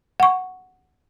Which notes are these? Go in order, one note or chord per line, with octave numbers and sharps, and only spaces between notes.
F#5 C#6